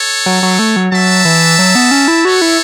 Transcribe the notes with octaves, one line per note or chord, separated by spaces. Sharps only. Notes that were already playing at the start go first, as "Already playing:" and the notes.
Already playing: A4 C#5
F#3
F#3
A3
F#3
F#3 E5 A5
E3
F#3
B3
C#4
E4
F#4 A4 C#5
E4